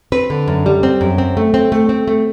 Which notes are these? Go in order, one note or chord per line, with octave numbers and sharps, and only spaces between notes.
C4 B4
D3
F#2
G3
C4
F#2
C4
A3
C4
A3
C4
A3